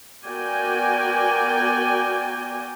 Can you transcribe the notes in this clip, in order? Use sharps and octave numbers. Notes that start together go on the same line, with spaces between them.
B3 F#4 A#4 D5 G5 G#5